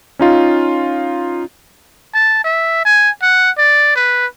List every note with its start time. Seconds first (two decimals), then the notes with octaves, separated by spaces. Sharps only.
0.19 C#4 D#4 F4
2.14 A5
2.44 E5
2.85 G#5
3.22 F#5
3.58 D5
3.96 B4